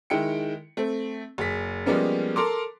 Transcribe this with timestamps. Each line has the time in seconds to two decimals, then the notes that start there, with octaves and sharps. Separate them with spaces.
0.10 D#3 G#3 E4 G5 C#7
0.77 A3 C4
1.38 F#1 G#4 B6
1.86 F3 G3 G#3 A#3 B3 C#4
2.36 A4 A#4 C6 D6